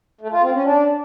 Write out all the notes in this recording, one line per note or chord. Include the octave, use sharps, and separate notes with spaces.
A3
F4
C4
C#4
D4